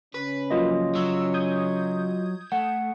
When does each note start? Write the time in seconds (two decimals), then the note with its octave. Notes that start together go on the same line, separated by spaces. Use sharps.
0.15 C#3 C#4 B4
0.50 F3 F#3 A#3 F4 D#5
0.95 F#3 E6
1.34 D#6 G6 G#6
2.52 A3 F#5